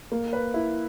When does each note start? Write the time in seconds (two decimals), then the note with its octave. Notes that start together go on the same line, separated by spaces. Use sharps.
0.12 A#3
0.33 B4
0.54 E4